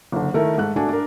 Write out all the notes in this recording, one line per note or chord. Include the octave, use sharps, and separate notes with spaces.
F#1 D3
D#3 A3 E4 A#4
G#2 A3 F#6
A3 D4 F#4 G#5
D4 A#4